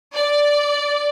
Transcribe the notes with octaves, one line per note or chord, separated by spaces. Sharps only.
D5